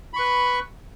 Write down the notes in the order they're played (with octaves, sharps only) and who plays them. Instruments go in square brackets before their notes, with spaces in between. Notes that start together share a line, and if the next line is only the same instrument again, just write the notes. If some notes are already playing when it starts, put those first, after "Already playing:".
[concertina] B5
C#6
B4